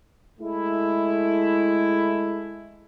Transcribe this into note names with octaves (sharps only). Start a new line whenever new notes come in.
G#3 A3 E4